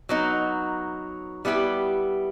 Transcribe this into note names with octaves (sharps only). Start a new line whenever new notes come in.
F#3 B3 D#4
G3 B3 E4 G4